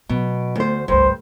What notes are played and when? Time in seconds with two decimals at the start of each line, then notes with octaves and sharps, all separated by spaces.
0.09 B2 F#3
0.56 D2 C5
0.88 G#1 C#2 G2 C5